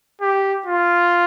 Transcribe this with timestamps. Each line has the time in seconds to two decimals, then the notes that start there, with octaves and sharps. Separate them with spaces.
0.22 G4
0.66 F4